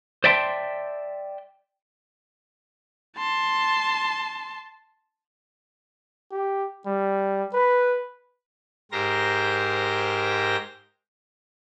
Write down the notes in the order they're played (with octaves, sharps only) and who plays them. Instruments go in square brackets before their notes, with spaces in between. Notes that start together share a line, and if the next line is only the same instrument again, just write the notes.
[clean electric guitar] C5 D5 E5 G5 A5 C6
[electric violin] A5 C6
[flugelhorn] G4
G3
B4
[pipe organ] G#2 G4 A#4 C5 A#6